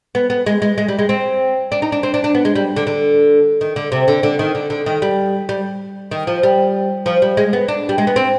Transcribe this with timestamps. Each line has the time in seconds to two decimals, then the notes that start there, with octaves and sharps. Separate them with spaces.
0.15 B3
0.30 B3
0.46 G#3
0.62 G#3
0.78 G#3
0.88 G3
0.99 G#3
1.09 C4
1.72 D4
1.82 D#4
1.92 D4
2.03 C4
2.14 D4
2.24 D4
2.35 B3
2.45 G#3
2.55 G3
2.77 D3
2.87 D3
3.61 D#3
3.76 D3
3.92 C3
4.08 D3
4.23 D3
4.39 D#3
4.55 D3
4.70 D3
4.86 D#3
5.02 G3
5.49 G3
6.11 D#3
6.27 F3
6.43 G3
7.06 F3
7.22 G3
7.37 G#3
7.53 B3
7.68 D4
7.89 G3
7.98 G#3
8.07 B3
8.16 C4